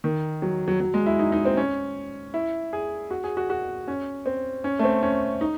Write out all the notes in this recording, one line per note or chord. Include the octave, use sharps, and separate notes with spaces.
D#3
F#3
F#3
F#3
G#3
E4
D#4
D#4
C4
C#4
E4
G#4
F#4
G#4
F#4
F#4
C#4
C4
C#4
A3
C4
C#4
D#4